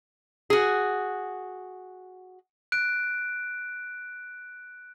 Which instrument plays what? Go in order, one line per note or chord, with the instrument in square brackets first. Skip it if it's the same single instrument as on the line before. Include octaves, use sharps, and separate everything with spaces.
[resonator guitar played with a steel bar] F#4 G#4
[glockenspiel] F#6 D7